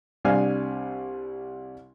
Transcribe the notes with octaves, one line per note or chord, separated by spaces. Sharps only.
C2 G3 D4 F5 G#5 F6